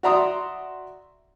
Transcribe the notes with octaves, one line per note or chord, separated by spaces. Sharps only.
F#4 D5 E5 A#5 C6 D#6